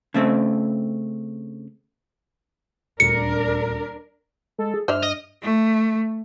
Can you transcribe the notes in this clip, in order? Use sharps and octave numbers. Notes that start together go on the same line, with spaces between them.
C#3 A3 C4
D#1 D2 D4 A#4 C#7
G#3 A4
G#4
G2 C5 D5 E5 F6
D#5
A3